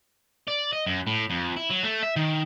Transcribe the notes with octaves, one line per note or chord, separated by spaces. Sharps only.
D5
D#5
F#2
A2
F2
E4
F#3
A3
E5
D#3